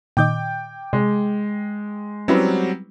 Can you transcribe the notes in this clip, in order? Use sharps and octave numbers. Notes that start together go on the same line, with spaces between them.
A#2 D#3 D#5 G5 D6 G6
C3 G#3
F#3 G3 C4 C#4 E4 B4